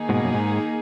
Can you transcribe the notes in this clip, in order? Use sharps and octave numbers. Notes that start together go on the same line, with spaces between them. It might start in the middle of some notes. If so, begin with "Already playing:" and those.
Already playing: D#3 A#3 D#4 G#4
G#2 B2
F#2
G#2